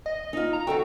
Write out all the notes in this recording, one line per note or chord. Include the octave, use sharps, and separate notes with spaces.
D#5
D#4 F4
A#5
D#3 F#4 A4 G5